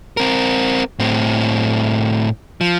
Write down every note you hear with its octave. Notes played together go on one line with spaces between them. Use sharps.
C4 A#4
A2 C4
F3